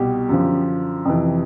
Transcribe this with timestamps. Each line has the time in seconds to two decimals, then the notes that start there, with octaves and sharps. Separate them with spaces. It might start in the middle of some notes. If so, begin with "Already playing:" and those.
Already playing: C2 B2 G4
0.29 F#2 D3 F3
1.05 F2 C3 E3